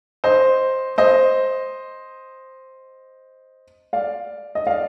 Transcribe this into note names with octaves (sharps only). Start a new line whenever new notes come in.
C5 D#5
C5 D#5
D5 F5
D#5
D5 F5